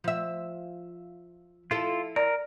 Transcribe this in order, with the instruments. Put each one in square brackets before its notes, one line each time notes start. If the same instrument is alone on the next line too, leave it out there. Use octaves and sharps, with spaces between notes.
[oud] F3 E5
[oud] E4 A4 [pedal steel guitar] F4
[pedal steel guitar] A#4 [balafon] D5